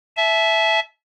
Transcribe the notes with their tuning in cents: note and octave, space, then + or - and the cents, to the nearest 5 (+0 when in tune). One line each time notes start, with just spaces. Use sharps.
E5 +0 A5 -35